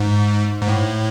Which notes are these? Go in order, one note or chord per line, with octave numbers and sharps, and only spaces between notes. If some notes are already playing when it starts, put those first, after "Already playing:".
Already playing: G#2
G#2
A2